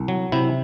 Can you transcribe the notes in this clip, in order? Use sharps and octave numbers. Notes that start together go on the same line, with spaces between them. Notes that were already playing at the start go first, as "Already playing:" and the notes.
Already playing: C2
F#3
C3 E4